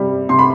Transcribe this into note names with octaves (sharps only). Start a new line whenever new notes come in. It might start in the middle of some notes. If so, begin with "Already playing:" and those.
Already playing: C3 G3
C3 C6
B5